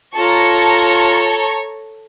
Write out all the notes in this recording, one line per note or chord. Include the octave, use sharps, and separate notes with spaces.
F4 A4 C#5 A5 A#5 C#6